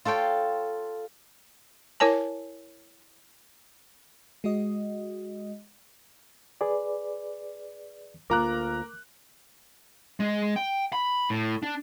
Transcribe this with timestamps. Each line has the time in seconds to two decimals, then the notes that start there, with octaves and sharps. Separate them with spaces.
0.05 F4 A4 C#5 G5 C6
2.00 E4 A#4 C#5 G#5 A5
4.44 G#3 F#4 D#5
6.61 G#4 B4 D5
8.30 D2 A#3 F4 A#4 A#5 D6 F#6
10.20 G#3
10.56 G5
10.93 B5
11.30 A2
11.63 D4